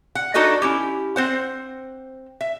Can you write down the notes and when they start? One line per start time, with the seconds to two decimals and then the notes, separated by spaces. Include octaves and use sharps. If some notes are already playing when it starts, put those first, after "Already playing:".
0.15 F#5
0.34 D4 D#4 F#4 A4 B4 D#5
0.62 C#4 E4 G4
1.16 C4 C5 F#5
2.41 E5